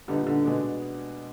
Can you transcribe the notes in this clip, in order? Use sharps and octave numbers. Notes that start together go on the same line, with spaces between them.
A#2 D3 G3 B3 D#4
D3
B2 G#3 B3 D4